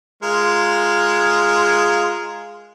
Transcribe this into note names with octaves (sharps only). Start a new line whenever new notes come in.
G#3 F4 A#4